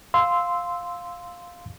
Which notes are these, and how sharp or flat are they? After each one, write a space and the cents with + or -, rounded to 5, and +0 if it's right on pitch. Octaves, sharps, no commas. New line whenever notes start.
F5 +5 C6 -10 E6 -5